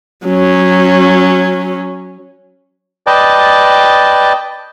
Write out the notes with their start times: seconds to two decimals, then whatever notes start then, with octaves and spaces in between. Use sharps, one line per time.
0.25 F#3 C#4
3.07 B4 D5 D#5 G5 A5